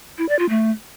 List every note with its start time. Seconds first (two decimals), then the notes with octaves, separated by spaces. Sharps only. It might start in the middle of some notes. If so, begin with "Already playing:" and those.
0.18 E4
0.29 D5
0.39 F4
0.49 A3